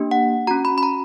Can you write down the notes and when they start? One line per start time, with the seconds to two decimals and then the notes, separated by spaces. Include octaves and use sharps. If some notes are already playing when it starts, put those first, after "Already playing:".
Already playing: A#3 D4 G4
0.11 F#5
0.47 C#4 F#4 A#5
0.65 B5
0.78 B5
0.83 A#5